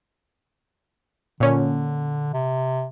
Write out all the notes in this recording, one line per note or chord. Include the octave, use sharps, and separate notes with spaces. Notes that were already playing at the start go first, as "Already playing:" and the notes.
A#2 D3 C#4
C3